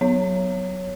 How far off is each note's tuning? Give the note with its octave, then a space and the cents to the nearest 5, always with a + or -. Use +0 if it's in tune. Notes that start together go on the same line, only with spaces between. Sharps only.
F#3 +0 B3 +0 C#5 +0